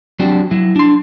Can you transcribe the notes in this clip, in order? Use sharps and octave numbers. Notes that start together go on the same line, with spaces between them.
F#3 C4 D4 F#4 G4
F#3 E4
D4 C6